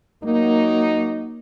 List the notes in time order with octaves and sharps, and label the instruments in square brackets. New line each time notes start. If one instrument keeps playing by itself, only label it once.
[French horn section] F#3 D#4 [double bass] A#3